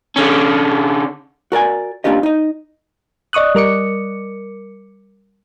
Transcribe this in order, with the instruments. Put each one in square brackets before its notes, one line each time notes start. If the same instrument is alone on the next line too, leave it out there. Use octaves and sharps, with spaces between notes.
[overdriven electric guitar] D3 C#4
[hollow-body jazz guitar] F#4 A#4 D5 G#5
A#3 C#4 D4 F4 G4 D#5
D#4 D#5
[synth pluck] D5 D#5 C#6 D#6 F#6
G3 A#4 D6 C#7